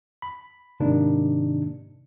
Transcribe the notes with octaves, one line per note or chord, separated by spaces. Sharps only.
B5
G#2 C3 D#3 A#3 D4 D#4